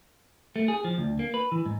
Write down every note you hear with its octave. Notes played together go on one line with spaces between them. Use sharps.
A3
G#4
F3
D2
A#3
B4
E3
G#2